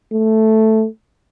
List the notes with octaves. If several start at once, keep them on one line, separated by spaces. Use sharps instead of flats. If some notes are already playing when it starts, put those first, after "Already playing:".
A3